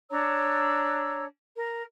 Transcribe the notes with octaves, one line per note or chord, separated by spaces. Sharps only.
D4 C#5 A#5 E6
A#4